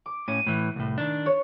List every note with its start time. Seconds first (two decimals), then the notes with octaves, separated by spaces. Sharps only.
0.06 D6
0.28 A2 C#4 D#7
0.47 A2 E3
0.76 C2 A2
0.98 D#3 D4
1.26 C#5